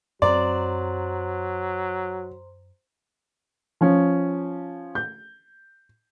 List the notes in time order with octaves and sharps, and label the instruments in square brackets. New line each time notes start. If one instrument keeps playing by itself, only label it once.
[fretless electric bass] F#2 C4 [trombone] F#3 [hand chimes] C5 A#5 C6 [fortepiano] D5
[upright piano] F3 C#4
G6